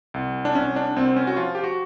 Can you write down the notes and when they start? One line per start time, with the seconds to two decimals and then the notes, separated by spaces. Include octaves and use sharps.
0.14 C2
0.45 D4
0.55 C2 C#4
0.76 D4
0.96 C2 C4
1.16 C#4
1.27 F#4
1.37 F3 F4
1.55 G4
1.64 F#4